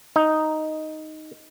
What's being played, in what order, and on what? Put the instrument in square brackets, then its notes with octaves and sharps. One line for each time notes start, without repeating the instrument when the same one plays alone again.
[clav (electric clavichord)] D#4